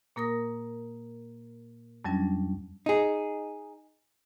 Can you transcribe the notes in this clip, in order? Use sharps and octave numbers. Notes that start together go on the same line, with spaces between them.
A#2 A#3 A#4 D#6 A#6
F2 F#3 G3 C#4 D4
D#4 G#4